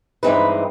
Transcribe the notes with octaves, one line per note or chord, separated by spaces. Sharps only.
G2 E3 G#3 C4 D#4 B4